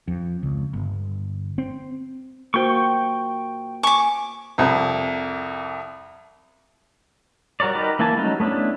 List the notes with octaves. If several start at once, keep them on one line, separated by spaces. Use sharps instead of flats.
F2
C#2
G1
C4
A#3 F#4 C5 G5 C#6
G#5 C#6 D6
C2 F2
G3 F#4 A#4 C#5 D5
D#4 F#4 G4 A#4 B4
E3 A#3 E4 G#5 A5
F#3 G3 A3 C#4 D#4
A3 B3 C#4 D4 E4